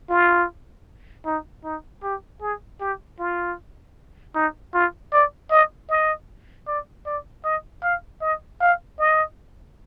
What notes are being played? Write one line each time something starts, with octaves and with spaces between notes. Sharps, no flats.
F4
D#4
D#4
G4
G#4
G4
F4
D#4
F4
D5
D#5
D#5
D5
D5
D#5
F5
D#5
F5
D#5